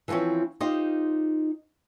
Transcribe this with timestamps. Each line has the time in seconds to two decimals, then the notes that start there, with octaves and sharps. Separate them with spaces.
0.08 E3 F3 A3 C4 C#4
0.60 D#4 F4 G4 C5 D#5